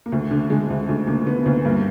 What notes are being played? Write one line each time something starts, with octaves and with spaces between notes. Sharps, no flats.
A#3
D2 A3
D3
D3 G#3
D2
D2 A3
D3 A#3
D3 B3
D2 A#3
G2 A#3